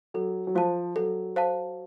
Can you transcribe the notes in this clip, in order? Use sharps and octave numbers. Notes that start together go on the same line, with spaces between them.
F#3 A4
F#3
F3 C5 F5 A5
F#3 A4
C5 F5 A5